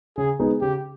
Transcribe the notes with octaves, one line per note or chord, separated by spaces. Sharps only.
C#3 G#4
G#3 B3 D#4 G#4
C#3 G4